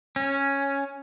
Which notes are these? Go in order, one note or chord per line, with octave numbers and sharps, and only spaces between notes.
C#4